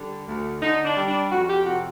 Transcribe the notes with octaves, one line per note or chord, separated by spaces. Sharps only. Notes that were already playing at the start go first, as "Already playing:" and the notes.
Already playing: D3 G3
D2
D3 D#4
D4
G3
D4
F2 F#4
G4
C3 F#4